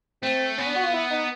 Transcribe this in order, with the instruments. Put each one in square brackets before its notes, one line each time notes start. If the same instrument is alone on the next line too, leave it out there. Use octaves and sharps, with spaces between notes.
[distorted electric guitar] A3 [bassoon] C4
[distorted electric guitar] B3 [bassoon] C#4
[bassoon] D4
F#4
F4
E4
D#4